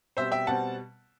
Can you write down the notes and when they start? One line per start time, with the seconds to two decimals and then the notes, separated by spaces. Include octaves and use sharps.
0.17 B2 G3 C4 C5 E5
0.32 E5 G5
0.47 B2 G3 C4 F#5 A5